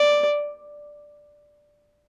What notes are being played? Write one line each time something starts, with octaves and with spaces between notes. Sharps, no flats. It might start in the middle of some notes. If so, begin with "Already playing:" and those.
Already playing: D5